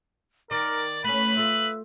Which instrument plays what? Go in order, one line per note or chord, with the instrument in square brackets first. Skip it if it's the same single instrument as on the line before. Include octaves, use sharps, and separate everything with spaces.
[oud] D#3 [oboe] A#4 [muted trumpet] D5 [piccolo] D6
[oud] A3 C#4 [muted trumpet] B4 [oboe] B5 [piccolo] F#7
[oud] A3 F4 [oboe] E5